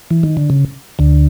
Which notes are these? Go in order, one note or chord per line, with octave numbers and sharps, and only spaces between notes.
E3
D#3
D3
C#3
D2 D3